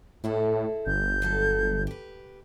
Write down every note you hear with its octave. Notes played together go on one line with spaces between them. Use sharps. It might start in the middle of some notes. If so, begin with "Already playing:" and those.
A2 G#3 E4 A4
G1 G6
D2 F#3 A4
G4 B4